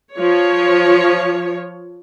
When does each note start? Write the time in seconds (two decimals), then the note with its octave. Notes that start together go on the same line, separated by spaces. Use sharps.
0.16 F3 C#5